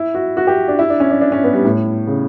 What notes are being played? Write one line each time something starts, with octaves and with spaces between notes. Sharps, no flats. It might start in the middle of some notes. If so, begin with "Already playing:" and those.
Already playing: E4
F#4
F#4
G4
D4
E4
D4
C#4
D4
D4
C#4
B3
G3
A2
C#3